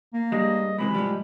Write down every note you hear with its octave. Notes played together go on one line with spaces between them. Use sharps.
A#3
G2 G3 G#3 D#5
F#2 C3 E3 G#3 B5
A2 F3 G3